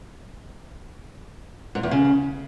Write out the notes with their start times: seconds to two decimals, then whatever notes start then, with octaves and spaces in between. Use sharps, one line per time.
1.75 G#2
1.83 E2
1.91 C#3